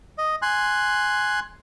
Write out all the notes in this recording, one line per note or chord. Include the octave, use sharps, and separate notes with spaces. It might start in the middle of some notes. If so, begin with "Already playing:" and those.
D#5
G#5 C6 F#6